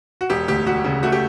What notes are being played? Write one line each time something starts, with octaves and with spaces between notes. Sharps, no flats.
F#4
E1 G4
D2 G4
E1 F#4
C#3
A3 F#4
G4